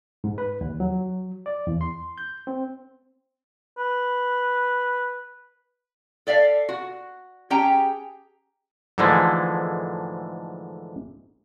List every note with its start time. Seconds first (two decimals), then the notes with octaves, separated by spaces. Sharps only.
0.24 G#2
0.38 B4
0.61 D#2
0.80 F#3
1.46 D5
1.67 E2
1.81 C6
2.18 G6
2.47 C4
3.78 B4
6.27 A4 D5 E5 F5
6.69 F#4
7.50 C#4 G4 G#4 G5 A#5
8.98 G#2 D3 E3 F3 G#3 A3